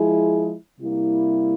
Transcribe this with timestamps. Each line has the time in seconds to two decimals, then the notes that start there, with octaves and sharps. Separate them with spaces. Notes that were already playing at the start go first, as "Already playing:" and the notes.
Already playing: F3 G#3 E4 G#4
0.80 C3 G3 A#3 E4